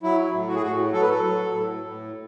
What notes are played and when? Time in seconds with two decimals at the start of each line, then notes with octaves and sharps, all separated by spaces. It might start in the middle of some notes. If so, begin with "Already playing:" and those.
0.03 F#3 E4
0.33 A2
0.48 F#4
0.55 G#4
0.63 A2 F#4
0.93 F#3 A4
1.01 B4
1.10 A4
1.23 F#3
1.54 A2
1.83 A2